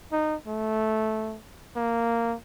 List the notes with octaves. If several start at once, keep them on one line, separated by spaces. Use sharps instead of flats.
D#4
A3
A#3